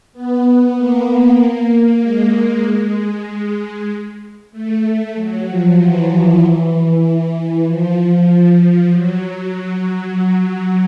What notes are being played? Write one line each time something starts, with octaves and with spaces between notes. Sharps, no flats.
B3
A#3
G#3
A3
F#3
F3
E3
E3
F3
F3
F#3